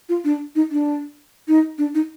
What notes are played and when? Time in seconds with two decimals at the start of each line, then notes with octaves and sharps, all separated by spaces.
0.09 F4
0.24 D4
0.56 D#4
0.71 D4
1.48 D#4
1.78 D4
1.95 D#4